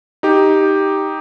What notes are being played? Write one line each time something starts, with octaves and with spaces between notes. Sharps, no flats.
D#4 G4